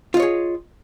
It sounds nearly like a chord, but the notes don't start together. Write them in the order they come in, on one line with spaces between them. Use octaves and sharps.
F4 D#5 C#5 G#4